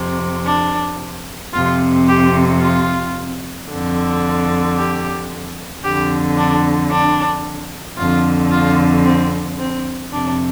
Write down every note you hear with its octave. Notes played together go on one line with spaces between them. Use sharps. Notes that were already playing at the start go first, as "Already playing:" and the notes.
Already playing: F2 C3
D4
F2 C3 F4
G4
F4
F2 D3
G4
F2 D3 G4
D4
D4
F2 D3 F4
F4
C4
C4
F2 C3 D4